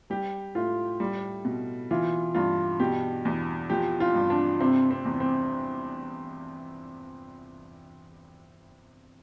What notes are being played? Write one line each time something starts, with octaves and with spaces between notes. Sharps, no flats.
G3 G4
A2 F4
G3
B2
E3 F4
G2 F4
B2 G4
E2
F3 G4
F4
G2
D4
C3 C4
C4
E2
C4